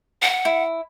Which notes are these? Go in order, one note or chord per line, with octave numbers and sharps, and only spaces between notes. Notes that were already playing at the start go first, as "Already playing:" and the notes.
F#5
E4